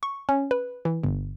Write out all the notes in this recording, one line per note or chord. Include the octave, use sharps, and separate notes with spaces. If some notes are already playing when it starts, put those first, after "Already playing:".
C#6
C#4
B4
E3
G1